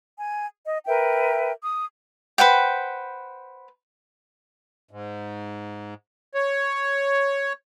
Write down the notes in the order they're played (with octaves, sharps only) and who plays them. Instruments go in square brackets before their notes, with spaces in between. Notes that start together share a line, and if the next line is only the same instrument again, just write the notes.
[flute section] G#5
D#5
A#4 B4 E5 G5
D#6
[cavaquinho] B4 C5 F#5 G5
[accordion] G#2
C#5